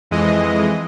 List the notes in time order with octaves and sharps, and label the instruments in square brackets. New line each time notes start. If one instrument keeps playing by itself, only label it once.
[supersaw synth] F2 E3 G#3 D#5